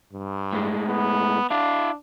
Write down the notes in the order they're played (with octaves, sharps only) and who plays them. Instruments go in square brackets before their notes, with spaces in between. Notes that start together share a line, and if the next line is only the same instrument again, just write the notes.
[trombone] G2
[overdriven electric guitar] A2 G#3
[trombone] B3
[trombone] D4 [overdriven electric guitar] E4 F5